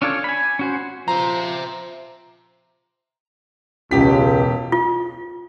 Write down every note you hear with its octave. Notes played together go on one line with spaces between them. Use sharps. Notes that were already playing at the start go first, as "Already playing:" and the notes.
C#4 D4 F4 A4 C#5
G#5 B5
C#4 F#4 C5
F3 C5 E5 A#5
E1 C#2 G4 B6
F4